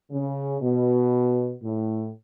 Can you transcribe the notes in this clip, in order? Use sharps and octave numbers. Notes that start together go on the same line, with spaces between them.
C#3
B2
A2